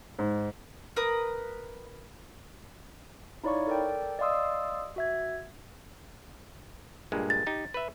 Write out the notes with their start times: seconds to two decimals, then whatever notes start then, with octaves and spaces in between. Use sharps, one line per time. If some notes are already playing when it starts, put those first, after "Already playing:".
0.19 G#2
0.96 A#4 B4 D#6
3.44 D#4 E4 C#5 D5 F5 C#6
3.67 A4 A#4 D5 G5
4.19 D5 D#5 F5 C6 D#6 E6
4.96 F#4 E5 G#6
7.12 G2 A#2 G#3
7.30 A6
7.46 D#4 G4
7.74 B4 E5